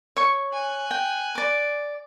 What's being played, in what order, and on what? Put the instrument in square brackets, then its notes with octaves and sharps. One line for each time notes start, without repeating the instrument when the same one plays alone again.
[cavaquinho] C#5 C#6
[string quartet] G#5 F#6
[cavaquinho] G5
D5 D6